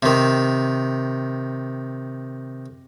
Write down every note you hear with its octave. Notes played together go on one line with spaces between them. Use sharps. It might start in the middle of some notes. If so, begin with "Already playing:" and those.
C3 D#3